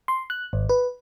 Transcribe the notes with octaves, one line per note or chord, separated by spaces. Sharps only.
C6
F#6
G#1
B4